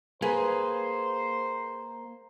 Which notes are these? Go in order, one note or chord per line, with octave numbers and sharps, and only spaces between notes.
A#3 G#4 B4 C5